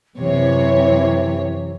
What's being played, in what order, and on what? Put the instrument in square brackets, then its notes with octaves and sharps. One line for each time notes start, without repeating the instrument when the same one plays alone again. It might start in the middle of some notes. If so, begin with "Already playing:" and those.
[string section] F#2 C3 C#5 [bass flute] E3